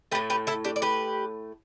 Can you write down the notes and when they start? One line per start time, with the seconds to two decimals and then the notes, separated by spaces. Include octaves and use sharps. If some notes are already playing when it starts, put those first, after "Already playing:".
0.12 A3 G4 B4
0.15 A2
0.30 G4 B4
0.47 E4 A4
0.65 D4 G4
0.76 D5
0.82 G4 B4